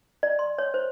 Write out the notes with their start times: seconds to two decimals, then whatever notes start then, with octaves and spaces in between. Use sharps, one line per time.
0.23 D5
0.39 C6
0.58 C#5
0.74 C5